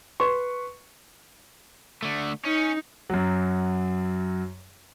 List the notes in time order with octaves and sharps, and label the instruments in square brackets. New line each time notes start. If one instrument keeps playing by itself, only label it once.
[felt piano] B4 C6 C#6
[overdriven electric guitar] D3 A3
[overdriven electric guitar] C#4 [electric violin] D#4
[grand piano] F#2 F#3